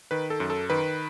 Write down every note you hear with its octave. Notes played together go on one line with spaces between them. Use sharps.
D#3 B4
A4
F#2
A4
D#3 B4